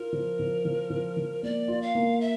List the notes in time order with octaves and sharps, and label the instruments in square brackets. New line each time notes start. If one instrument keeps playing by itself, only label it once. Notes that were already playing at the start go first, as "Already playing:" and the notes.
Already playing: [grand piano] F4 [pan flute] A#4
[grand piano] F3
F3
F3
F3
F3
[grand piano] A#3 [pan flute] D5
[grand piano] F4
[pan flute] F5
[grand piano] A#3
[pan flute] E5